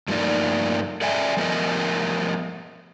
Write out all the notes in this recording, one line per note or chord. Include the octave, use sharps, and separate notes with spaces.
G2 F3 A3 A#3 D#4 D5
A4 D5 E5 G5 G#5
F3 A3 B3 A#4 D#5